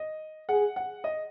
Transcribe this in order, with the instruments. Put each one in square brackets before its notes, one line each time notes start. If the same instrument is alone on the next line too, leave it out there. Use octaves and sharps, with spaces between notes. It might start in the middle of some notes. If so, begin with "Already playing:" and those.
Already playing: [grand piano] D#5
[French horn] G#4 [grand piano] F#5
[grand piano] F#5
D#5